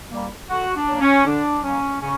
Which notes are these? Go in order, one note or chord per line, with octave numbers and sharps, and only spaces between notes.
G3 A#3
D3 F#4
D4
F#3 A#3
C#4
D3 D4
F#3 A#3 C#4
C#3 C#4